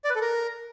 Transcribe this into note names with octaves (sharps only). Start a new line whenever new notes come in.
D5
B4
A4
A#4